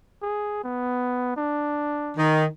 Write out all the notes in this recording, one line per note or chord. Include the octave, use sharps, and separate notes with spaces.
G#4
B3
D4
D#3